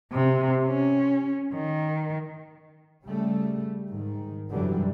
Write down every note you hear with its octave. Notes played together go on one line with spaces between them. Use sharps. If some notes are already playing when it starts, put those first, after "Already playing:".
C3
C#4
D#3
C#3 G3 A3
G#2 D#3
F#2 B2 D3 E3 F#3 G3